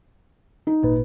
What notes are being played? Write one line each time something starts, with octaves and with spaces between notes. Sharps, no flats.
D#4
G#1 A#2 B4